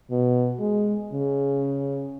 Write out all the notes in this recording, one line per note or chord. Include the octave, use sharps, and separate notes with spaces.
B2
G#3
C#3